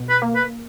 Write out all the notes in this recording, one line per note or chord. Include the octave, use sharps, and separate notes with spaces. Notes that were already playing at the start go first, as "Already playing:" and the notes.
Already playing: B2
B4
A#3
B4